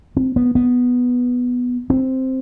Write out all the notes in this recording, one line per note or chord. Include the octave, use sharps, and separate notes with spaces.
C4
B3
B3
C4